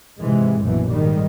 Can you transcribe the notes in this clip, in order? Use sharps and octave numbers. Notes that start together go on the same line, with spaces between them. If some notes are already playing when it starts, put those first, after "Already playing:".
G#2 C3 E3 G#3
A#1 F#2 B2 E3
G#2 D#3 G3